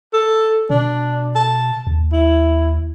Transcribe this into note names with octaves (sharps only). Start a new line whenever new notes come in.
A4
B2 D4
A5
D#2
E4